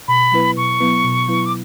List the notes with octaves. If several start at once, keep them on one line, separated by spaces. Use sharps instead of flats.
B2 B5
F#3 B3 E4 B4
B2 C#6
F#3 B3 E4 B4
B2
F#3 B3 E4 B4
D6